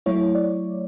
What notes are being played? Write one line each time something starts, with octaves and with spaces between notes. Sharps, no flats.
F#3 A3 E4 C#5
D5